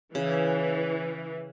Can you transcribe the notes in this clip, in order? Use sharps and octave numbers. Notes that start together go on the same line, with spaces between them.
C#3 E3